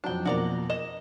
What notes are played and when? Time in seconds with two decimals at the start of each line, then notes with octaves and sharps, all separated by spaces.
0.04 F2 F#3 D4 G5
0.26 F2 B2 A#3 F#4 D5 A#5
0.70 D#5 E7